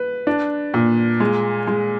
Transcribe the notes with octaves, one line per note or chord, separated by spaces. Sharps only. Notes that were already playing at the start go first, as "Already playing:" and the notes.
Already playing: B4
D4
A#2
G#3
G#3